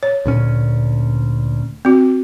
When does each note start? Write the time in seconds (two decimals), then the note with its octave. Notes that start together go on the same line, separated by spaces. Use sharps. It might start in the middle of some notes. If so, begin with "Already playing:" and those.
0.03 C#5
0.26 D2 A#2 C#4
1.85 C4 F#4